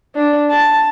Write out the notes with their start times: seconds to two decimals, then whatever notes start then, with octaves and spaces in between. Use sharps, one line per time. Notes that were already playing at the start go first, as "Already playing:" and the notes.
0.15 D4
0.50 A5